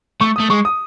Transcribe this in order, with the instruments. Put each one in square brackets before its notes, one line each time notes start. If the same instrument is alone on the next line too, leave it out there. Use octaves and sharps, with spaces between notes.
[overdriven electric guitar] A3 [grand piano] C#6
[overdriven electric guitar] A3 [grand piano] D#6
[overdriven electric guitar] G#3 [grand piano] C#6
[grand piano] D#6